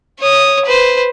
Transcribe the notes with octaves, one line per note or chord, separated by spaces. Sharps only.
C#5 D#6
B4 C5